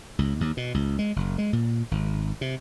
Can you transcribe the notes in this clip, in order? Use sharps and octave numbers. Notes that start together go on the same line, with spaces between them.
C#2
D#2
B2
C#2
G#3
F#1
G#3
A#2
G#1
C3